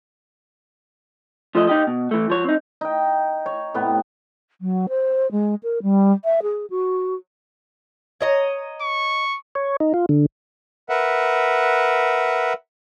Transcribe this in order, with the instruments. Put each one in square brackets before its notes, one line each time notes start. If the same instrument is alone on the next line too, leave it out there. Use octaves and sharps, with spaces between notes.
[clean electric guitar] F3 A3 D#5
D#4 G4 D#5
B2
E3 A3
F3 C#5
C4 D#4
[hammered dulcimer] D#4 G5
C#5
A2 C3 B3
[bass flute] F#3
C5
G#3
A#4
G3
E5
G#4
F#4
[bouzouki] C#5 D#5 A#5
[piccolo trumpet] C#6
[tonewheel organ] C#5
D#4
F4
D3
[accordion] A#4 B4 E5 F#5